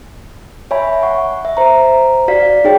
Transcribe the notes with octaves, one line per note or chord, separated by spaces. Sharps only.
C#5 E5 G#5 B5
F#5 C#6
E5
C5 A#5
F#4 D5 F5 B6
D#4 G#4 C#5 G5